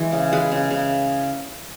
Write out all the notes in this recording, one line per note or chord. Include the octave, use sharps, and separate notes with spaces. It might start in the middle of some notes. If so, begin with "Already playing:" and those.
Already playing: E3 G#3
C#3
G#3 G#4 B4
C#3
C#3